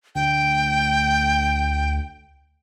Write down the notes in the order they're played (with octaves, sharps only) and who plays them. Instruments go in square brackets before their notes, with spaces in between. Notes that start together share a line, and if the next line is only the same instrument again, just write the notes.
[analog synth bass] D2 [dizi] G5